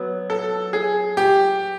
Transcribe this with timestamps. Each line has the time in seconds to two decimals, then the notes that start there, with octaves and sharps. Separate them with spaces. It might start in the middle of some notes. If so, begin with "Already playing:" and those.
Already playing: F#3 B3
0.30 A4
0.73 G#4
1.17 G4